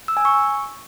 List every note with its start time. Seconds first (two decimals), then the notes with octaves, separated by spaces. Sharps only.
0.08 E6
0.17 G#5
0.25 C#6